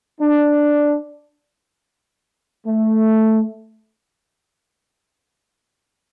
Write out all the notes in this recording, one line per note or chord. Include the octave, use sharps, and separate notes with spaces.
D4
A3